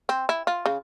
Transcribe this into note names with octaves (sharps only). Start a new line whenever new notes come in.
C4
E4
F4
C#3